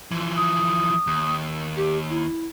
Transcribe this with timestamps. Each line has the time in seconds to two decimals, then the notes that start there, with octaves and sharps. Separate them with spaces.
0.11 E3 F3
0.36 D#6
1.07 D#2
1.76 G4
2.10 E4